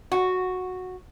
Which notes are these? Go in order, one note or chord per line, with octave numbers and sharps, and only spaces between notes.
F#4